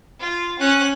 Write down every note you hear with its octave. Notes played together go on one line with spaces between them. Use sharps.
F4
C#4 F#6